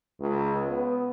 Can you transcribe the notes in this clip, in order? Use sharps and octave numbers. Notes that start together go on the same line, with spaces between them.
C#2
B3